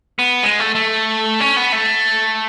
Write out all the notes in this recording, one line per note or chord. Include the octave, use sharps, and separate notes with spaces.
B3
G#3
A3
A3
C#4
B3
A3